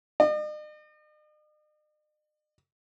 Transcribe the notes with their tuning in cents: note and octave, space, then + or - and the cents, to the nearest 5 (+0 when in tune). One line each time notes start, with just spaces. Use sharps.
D#5 -45